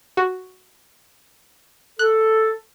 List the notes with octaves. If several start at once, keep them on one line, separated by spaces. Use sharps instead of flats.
F#4
A4 F#6